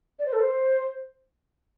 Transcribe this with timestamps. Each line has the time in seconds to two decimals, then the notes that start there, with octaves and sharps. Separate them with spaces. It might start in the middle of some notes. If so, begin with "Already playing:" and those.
0.19 D5
0.26 C5
0.33 A4
0.40 C5